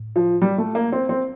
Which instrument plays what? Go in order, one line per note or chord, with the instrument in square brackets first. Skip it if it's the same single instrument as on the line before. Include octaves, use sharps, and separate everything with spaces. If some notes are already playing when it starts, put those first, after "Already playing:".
Already playing: [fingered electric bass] A2
[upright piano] F3
G3
A3
A#3
C4
C4